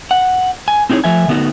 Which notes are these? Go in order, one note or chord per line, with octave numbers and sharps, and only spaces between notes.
F#5
G#5
C4 D#4 E4 G#4 C#5
F3 A3 E5 G#5
D3 A3 B3 D#4 F#4